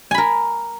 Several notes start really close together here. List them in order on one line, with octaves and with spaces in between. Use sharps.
G#5 B5 A#4